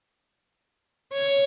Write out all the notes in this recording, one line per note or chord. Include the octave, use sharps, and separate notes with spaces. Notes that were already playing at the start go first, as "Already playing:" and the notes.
C#5